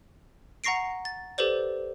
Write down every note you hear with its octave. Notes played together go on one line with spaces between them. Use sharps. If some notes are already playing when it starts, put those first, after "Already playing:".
F#5 A#5 C#6 A#6 C7 D7
A6
G4 A4 B4 C5 D5